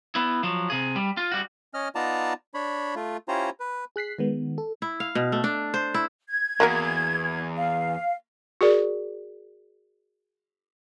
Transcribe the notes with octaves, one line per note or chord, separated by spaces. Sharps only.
B3 E4
F3 F#3
C3 G#4
G3
F4
G3 F#4
C#4 D#5 F6
B3 D#4 F4 D5 A5 A#5
D4 C#5 B5
A3 F4
C#4 E4 F4 G4 C5 A#5
B4
G#4 F#6 B6 C7
D#3 G#3 B3
A4
E4
F5
B2
A3
D4
C5
E4
G#6
E2 A#3 F#4 A#4
F5
F#4 G#4 A#4 D5